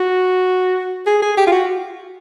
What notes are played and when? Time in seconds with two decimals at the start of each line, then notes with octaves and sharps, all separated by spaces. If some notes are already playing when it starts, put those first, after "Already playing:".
Already playing: F#4
1.06 G#4
1.22 G#4
1.37 G4
1.47 F4
1.52 F#4